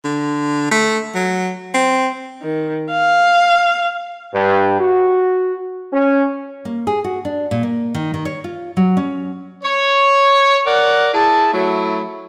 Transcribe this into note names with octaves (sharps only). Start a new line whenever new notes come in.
D3
A3
F#3
C4
D#3
F5
G2
F#4
C#4
A#3
G#4
F#4
D4
A#2
A#3
D#3
D#3
C#5
F4
F#3
C#4
C#5
A#4 D5 F#5
E4 G#4 A5
F#3 A3 E4